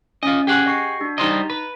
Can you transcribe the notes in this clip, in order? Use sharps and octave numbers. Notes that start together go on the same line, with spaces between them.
C#4 F4 D#5
G4 G#4 F#5
D#5 C#6 C7
D4 F#4
G3 D#4 C5 D#5 A#5
B4